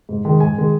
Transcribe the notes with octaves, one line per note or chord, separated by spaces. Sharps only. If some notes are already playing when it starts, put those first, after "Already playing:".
G#2
D#3 G#3
G#2 G#5
D#3 G#3